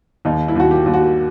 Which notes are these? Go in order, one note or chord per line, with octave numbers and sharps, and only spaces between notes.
D#2 D#4
E4
D#2 F#4
G4
D#2
F#4